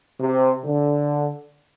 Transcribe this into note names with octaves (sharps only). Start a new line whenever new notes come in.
C3
D3